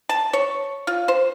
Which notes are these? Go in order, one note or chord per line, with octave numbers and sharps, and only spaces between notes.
A5
C#5
F4
C5